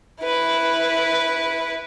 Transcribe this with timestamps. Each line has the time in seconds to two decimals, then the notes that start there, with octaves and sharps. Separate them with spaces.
0.23 E4 B4